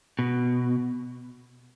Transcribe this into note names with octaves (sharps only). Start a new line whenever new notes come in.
B2